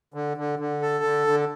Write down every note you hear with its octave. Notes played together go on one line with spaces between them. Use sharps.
D3
D3
D3
A4
D3
D3